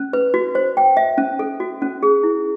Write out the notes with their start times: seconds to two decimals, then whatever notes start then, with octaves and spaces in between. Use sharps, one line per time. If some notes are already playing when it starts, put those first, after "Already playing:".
Already playing: C#4
0.13 B4
0.34 F#4
0.55 C5
0.77 G5
0.97 E5
1.18 C#4
1.39 A4
1.60 F#4
1.82 C#4
2.03 G#4
2.23 E4